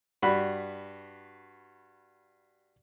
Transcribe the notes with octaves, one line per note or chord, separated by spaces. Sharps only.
G2 F#4 B5